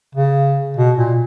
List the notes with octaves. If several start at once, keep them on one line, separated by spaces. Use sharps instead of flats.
C#3
B2
A#2